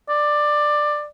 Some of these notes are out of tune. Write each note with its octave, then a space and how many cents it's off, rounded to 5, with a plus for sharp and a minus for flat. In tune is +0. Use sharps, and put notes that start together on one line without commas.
D5 +15